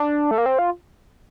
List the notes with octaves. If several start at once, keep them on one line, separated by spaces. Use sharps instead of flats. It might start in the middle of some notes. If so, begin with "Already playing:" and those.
Already playing: D4
A3
A#3
C4
F4